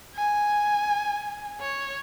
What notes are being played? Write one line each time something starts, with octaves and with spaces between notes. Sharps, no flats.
G#5
C#5